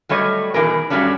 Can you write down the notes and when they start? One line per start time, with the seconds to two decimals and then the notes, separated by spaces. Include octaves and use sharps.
0.09 F#3 G3 A3 C#5 D#5
0.54 B2 D#3 E3 A#3 G#4 A#4
0.90 G2 F#3 G3 A3 C#4 D4